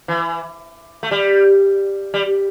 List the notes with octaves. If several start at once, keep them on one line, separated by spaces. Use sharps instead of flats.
E3
A3
G3
G3